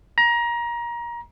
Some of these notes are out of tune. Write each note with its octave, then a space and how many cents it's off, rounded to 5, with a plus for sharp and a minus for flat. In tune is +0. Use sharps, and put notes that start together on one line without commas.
A#5 +25